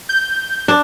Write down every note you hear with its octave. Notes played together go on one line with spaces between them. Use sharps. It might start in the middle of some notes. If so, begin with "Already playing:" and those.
G6
D4